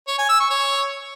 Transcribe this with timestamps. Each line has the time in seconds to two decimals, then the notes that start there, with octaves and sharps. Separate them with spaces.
0.08 C#5
0.18 G#5
0.29 E6
0.40 C#6
0.51 C#5